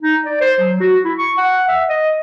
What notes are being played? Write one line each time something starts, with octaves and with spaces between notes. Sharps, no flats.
D#4
D5
C5
F#3
F#4
E4
C#6
F#5
E5
D#5